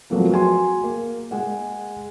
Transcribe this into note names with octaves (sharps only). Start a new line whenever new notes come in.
F3 F#3 A3 A#3 C4 B4
F#4 G#4 G#5 C6
A#3
G#3 G#4 F#5